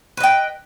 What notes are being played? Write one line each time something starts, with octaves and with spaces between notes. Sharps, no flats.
B4 D#5 G5